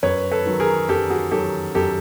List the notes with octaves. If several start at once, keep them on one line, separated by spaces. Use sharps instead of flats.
F#2 B4 C#5
A4 B4
D#3 F#3
G#4 A#4
F#2 G4 A4
F#4 G#4
D#3 F#3 G4 A4
F#2 G4 A4